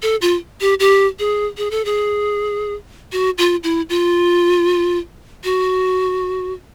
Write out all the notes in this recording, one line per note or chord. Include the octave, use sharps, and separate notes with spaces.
A4
F4
G4
G4
G#4
G#4
A4
G#4
F#4
F4
E4
F4
F#4